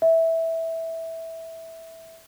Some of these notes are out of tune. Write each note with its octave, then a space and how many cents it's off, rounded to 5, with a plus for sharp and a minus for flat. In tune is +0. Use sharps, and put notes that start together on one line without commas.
E5 -10